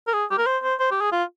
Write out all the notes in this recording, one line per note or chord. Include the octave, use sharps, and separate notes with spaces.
A#4
G#4
G4
A#4
C5
C5
C5
G4
G#4
F4